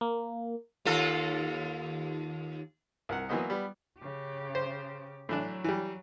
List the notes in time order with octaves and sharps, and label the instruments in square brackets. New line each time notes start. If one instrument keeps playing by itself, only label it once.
[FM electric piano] A#3
[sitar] D#2 F4 A4
[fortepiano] C2 A#4 F#5
E3 F#3 A#3 B3 C5 D#5
G3 B3
[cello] C#3 G4
[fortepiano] C5
[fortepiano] A2 E3 D4 [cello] F#3
[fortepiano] E3 G3